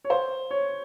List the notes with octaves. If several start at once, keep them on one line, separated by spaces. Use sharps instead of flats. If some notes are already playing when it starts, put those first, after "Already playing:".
C#5
C5
C#5